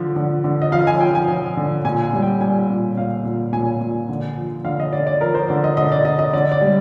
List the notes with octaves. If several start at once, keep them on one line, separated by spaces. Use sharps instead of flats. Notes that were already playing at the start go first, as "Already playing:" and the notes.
Already playing: D3 F3
D3
D3
D#5
F3 F5
G#5
F3 G5
G#5
F3
D3
A#2 G#5
G#5
G3
G5
G3 G#5
A#2
A#2 F5
A#2
A#2 G#5
A#2
D3
F3
D3 F5
D#5
D3 D5
D5
F3 A#4
C5
D3 D5
D#5
D3 D#5
D5
D3 D#5
D#5
D3 D5
D5
G3